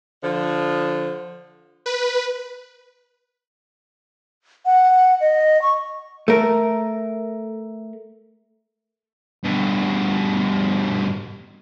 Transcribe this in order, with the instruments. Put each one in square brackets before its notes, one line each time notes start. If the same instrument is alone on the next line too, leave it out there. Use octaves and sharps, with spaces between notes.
[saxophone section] D3 F3
[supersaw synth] B4
[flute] F#5
D#5
C#6
[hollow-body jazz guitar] A3 A#4
[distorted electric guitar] G2 B2